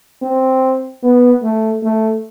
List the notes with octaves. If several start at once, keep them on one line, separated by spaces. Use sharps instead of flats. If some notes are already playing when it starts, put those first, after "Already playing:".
C4
B3
A3
A3